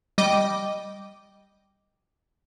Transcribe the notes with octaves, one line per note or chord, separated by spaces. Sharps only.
G3 D#5 G5 D6